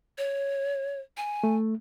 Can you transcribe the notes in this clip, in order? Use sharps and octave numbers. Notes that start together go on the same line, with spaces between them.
C#5
G#5
A3